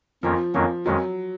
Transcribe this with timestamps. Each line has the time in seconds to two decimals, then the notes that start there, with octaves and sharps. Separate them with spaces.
0.23 F2 D#3 F3 A#3 C#4 F4
0.54 F2 D#3 F3 F#3 A#3 C#4
0.86 F2 D#3 F#3 G#3 C#4